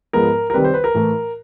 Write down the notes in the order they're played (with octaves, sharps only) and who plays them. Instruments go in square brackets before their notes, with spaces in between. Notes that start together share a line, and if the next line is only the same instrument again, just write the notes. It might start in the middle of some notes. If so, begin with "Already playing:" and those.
[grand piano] G#2 F3 G#3 B3 A#4
A#4
C3 D#3 G3 C4 B4
C5
B4
A#4
A2 E3 A3